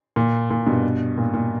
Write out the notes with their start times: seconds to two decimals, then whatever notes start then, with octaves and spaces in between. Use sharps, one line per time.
0.16 A#2
0.50 A#2
0.67 G2 B2
1.18 A#2
1.34 A#2